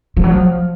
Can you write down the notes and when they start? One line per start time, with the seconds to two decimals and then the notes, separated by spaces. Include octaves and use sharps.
0.17 F3
0.24 F#3
0.32 F3